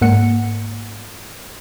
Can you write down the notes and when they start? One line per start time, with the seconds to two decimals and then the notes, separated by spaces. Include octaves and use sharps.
0.01 G#2 A#3 F#5 C#7